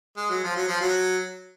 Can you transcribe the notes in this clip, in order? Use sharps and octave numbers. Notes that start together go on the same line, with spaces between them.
G#3
F#3
F3
F#3
F3
F#3